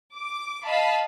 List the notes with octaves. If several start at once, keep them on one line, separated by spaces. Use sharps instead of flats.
D6
D#5 F5 A5 B5